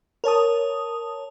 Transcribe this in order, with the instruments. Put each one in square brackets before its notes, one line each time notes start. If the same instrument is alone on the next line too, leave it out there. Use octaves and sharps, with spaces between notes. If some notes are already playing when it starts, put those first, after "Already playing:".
[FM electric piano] A#4 C#5 A5 D#6